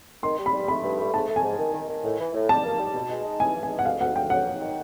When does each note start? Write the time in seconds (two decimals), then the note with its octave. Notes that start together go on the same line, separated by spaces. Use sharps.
0.23 D#3 C6
0.38 G3
0.46 B5
0.53 G3
0.68 A3 B5
0.83 G2
0.99 A3
1.14 G#2 A5
1.29 A3
1.36 G#5
1.43 G#2
1.59 D#3
1.74 D#3
1.89 D#3
2.04 A2
2.20 E3
2.34 A2
2.49 G3 A5
2.65 A#3
2.79 G3
2.94 B2
3.10 G#3
3.24 D#4
3.39 E3 G#5
3.56 E3
3.63 G#5
3.71 G#3
3.79 F#5
3.85 D2 F5
4.01 D2 F#5
4.15 D2 G5
4.30 F#3 F#5
4.46 F#3
4.61 D#3